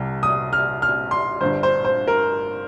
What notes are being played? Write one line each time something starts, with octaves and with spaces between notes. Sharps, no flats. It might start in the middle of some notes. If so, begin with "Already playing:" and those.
Already playing: C2 C3 G3
D#6
F6
F6
C6
G1 G2 G3 C5
C5
C5
A#4